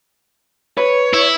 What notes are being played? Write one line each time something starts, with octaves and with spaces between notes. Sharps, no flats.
B4 C#5
E4